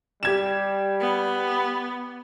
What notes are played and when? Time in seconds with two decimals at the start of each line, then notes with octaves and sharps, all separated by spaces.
0.23 G3 G4 G#6 E7
1.00 B3